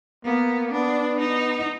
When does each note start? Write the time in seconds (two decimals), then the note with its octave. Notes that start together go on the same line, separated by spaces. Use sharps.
0.25 A#3 B3
0.72 B3 D4
1.20 D#4